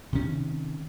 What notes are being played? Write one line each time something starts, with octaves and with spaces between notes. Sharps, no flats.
C3 D#3 C#4